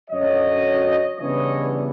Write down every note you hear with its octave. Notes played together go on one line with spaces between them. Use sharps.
F#2 D3 F#3 C#5 D#5
C#3 E3 G3 B3 D4 C#5 D#5